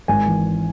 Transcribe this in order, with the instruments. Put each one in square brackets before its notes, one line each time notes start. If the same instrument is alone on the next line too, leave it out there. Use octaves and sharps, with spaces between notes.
[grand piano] G#1 G#5
E3